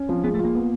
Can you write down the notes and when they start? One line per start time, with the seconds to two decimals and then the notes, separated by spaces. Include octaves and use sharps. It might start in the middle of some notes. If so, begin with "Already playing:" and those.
Already playing: C#4
0.09 F3 C4
0.24 G#3 B3
0.34 A3
0.39 F4
0.45 A#3
0.55 B3